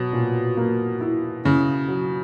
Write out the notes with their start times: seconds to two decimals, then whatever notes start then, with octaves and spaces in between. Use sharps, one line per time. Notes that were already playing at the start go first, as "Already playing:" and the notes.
Already playing: B2 F#3
0.13 A#2
0.57 A#3
1.01 E4
1.45 C#3 E4
1.89 F#3